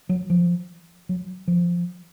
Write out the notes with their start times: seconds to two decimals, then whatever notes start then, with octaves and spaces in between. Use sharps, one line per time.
0.09 F#3
0.30 F3
1.09 F#3
1.48 F3